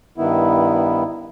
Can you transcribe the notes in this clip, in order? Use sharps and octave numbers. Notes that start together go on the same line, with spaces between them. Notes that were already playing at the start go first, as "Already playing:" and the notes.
G2 D#3 B3 E4